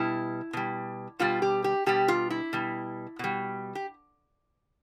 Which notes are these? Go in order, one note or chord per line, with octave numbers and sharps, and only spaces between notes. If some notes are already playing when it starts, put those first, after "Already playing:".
Already playing: B2 G3 E4
B2 G3
B2 G3 F4
G4
G4
B2 G3 G4
F4
E4
B2 G3
B2 G3
G4